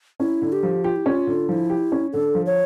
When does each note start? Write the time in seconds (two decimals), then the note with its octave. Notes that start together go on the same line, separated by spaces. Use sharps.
0.20 C#4 E4
0.42 D3
0.52 G4
0.63 F3
0.84 F4 G4
0.96 E4
1.06 C#4 F4
1.27 D3
1.48 F3 E4 F4
1.70 G4
1.92 C#4
2.13 D3 A4
2.35 F3
2.46 C#5